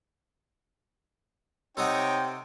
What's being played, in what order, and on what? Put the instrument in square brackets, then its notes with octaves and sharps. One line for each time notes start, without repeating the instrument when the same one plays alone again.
[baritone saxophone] C3 [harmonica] D#4 C#5 [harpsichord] A4 D#5 F#5 [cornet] G5